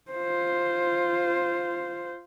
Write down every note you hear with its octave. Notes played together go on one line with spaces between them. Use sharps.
F4 C5